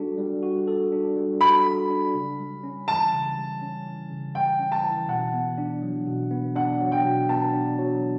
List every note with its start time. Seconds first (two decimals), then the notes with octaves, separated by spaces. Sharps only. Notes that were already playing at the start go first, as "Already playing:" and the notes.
Already playing: G3 D4 F#4 A4
0.18 G3
0.43 F#4
0.68 A4
0.92 D4
1.16 G3
1.41 F#4 B5
1.65 A4
1.90 D4
2.14 C#3
2.39 G3
2.63 C#4
2.88 E3 A5
3.13 C#3
3.37 G3
3.62 C#4
3.86 E3
4.11 C#3
4.35 G3 G5
4.59 C#4
4.72 A5
4.84 E3
5.08 B2 F#5
5.33 B3
5.58 D4
5.82 F#3
6.07 B2
6.31 B3
6.55 D4 F#5
6.81 F#3
6.92 G5
7.05 B2
7.29 B3 A5
7.53 D4
7.79 F#3